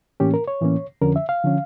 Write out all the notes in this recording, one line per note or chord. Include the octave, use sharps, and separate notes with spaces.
A2 E3 A#3 C#4 G4
A#4
C#5
A2 E3 A#3 C#4
F2 D3 F3 C#4 A#4
E5
F5
D3 F3 C#4